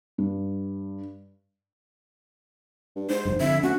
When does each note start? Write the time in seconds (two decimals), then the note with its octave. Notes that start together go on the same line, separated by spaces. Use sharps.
0.18 G2
2.96 G2
3.10 G#2 C5
3.25 F1 G2
3.40 F2 D3 E5
3.63 D2 C#4 F#4